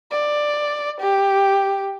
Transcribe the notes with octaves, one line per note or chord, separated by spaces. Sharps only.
D5
G4